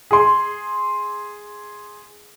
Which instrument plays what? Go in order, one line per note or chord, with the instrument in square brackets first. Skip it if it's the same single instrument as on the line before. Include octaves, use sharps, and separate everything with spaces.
[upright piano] G#4 C6